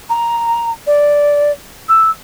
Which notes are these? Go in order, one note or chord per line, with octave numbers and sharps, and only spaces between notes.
A#5
D5
E6